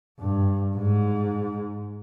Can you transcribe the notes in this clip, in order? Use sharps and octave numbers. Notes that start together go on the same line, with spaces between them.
G2
G#2